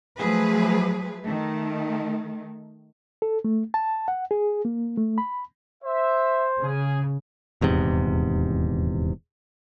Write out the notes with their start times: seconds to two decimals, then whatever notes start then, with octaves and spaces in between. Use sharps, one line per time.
0.16 F3 F#3 A3 G#4 B4
1.23 D#3 A3
3.22 A4
3.45 A3
3.74 A5
4.08 F#5
4.31 G#4
4.65 A#3
4.97 A3
5.18 B5
5.84 C5 E5
6.62 C#3 G#4 G#5
7.61 D#1 E2 G#2 C3